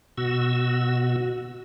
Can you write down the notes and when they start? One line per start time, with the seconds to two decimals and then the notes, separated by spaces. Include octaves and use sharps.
0.18 B2 F#4 E6